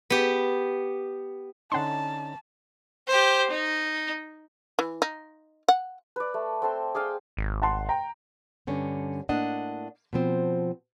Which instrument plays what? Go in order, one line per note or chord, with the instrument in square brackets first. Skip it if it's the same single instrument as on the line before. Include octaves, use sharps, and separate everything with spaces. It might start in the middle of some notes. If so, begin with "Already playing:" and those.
[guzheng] B3 G4
[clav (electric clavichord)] D3 C#4 D#4 [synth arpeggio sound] F#5 C6 [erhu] A5
[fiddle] G4 C5
D#4
[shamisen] E3
D#4
F#5
[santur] B4 D5
A3
C4 A4 C6
G#4 D5 F5 G5
[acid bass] G#1
[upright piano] F#5 A5 C6
G5 A#5
[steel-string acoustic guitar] G2 D3 C#4
A2 A#3 D4 D#5 F#5
B2 F3 C4